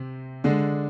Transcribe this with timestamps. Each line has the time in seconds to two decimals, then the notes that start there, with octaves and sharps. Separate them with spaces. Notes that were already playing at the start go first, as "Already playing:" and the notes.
Already playing: C3 C4
0.44 D3 G#3 D4